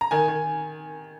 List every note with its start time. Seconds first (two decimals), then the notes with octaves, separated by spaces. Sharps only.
0.01 A#5
0.11 D#3 G#5
0.28 D#3